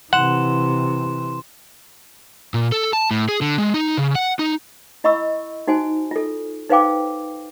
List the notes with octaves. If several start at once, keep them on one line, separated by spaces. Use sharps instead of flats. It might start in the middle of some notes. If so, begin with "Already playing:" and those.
C3 E3 F#5 C6 E7
A#2
A4
A5
A2
G#4
D3
G#3
D#4
C#3
F#5
D#4
E4 D#5 B5 C#6 E6
D#4 F#4 C5 G#5
F4 A4
D#4 B4 C5 F5 G5 D6